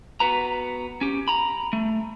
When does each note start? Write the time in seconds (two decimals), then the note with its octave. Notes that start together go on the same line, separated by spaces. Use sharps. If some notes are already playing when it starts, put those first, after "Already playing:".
0.20 B3 F#4 B4 A#5
1.01 C#4 G4
1.28 A#5 B5
1.73 A3